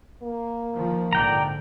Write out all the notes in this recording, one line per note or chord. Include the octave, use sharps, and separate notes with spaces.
A#3
D#3 F3
A#1 G#2 D3 D5 G5 A#5